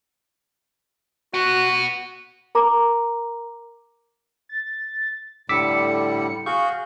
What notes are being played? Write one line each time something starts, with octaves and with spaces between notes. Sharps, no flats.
B2 F#4 F#5
A#4 A#5 D6
A6
A2 D3 G3 D6 E6 B6 C#7
F#4 G#4 F5 C#6 G6